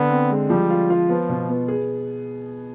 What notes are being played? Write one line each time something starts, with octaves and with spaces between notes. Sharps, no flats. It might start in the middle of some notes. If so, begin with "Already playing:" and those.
Already playing: D3 B3
C4
G#3
F3 G3
F4
F4
F3 B3
B2
B3
G#4